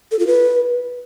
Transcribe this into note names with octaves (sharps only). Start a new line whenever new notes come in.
A4
F4
B4